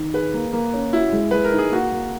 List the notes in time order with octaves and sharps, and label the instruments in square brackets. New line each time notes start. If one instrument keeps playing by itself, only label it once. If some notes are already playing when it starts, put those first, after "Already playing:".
Already playing: [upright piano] D#3
[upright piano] G#4 [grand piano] B4
[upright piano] A#3
A#3
C#4
[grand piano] E4 [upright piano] F#4
[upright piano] G#3
[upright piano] G#3 [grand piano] B4
[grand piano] A#4
[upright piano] D#4
[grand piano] G#4
[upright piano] A#3 [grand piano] F#4
[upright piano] A#3